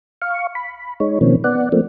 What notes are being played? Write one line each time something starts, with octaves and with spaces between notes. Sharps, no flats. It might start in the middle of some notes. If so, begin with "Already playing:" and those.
F5 C#6
B5
G#3 D#4 C#5
B2 D#3 F3 A#3 C4 C#4
B3 D5 F#5
F3 A3 A#3 C4